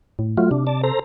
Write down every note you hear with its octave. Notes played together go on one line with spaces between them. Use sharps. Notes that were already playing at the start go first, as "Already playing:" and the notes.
A2
F#3 A3 F4
C3 D4
D5 A5
A4 C5 A#5